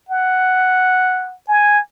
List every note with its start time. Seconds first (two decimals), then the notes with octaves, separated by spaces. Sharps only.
0.09 F#5
1.48 G#5